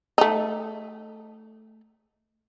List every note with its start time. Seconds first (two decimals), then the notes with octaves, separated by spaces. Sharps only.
0.18 A3 D#4